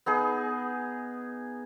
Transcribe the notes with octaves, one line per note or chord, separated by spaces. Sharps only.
B3 D#4 G#4